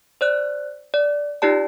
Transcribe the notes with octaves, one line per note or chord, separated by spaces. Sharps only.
C5 D5 F#6
D5
D#4 F4 G4 D5 A5